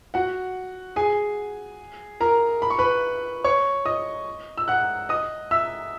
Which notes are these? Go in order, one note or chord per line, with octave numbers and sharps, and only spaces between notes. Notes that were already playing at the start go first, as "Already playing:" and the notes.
F#4 F#5
G#4 G#5
A#4 A#5
B5
C#6
B4 B5
C#5 C#6
D#5 D#6
E6
F#5 F#6
D#5 D#6
E5 E6